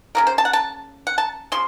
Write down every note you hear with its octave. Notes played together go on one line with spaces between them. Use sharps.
C#3 F3 A#3 A#4
C5
A5
F#5
A5
F#5
A5
C#3 F3 C6